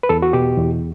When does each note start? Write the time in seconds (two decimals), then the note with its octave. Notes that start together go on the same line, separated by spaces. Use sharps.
0.03 B4
0.09 E2 A4
0.22 F#4
0.33 B2 G4
0.57 E2